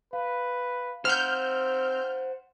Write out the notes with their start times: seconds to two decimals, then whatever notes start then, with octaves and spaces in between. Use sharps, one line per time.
0.13 B4 F5
1.05 C4 C5 F#5 F6 G6